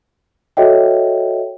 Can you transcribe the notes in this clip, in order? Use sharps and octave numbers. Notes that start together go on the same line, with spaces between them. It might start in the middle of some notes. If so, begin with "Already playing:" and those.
F#4 A4 C#5 D#5 E5 G5